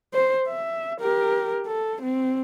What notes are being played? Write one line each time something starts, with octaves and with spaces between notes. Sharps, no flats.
C5
E5
G4 A#4
A4
C4